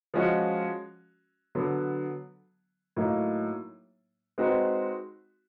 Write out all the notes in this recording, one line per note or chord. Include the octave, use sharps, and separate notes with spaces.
F3 G#3 C#4 F#4
D3 F#3 B3
A2 F#3 A#3 D#4
G#3 C4 D#4 F#4 B4